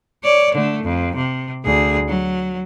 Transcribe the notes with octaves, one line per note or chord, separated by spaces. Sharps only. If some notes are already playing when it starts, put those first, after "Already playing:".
C#5 D5
D3 A3
F2
C3
D2 G#4
F#3